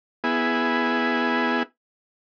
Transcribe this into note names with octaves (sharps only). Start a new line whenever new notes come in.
B3 E4 G#4